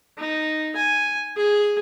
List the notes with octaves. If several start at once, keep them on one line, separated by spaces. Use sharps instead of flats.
D#4
G#5
G#4